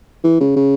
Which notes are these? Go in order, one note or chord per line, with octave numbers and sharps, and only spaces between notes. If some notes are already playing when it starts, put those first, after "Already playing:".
E3
C#3
C#3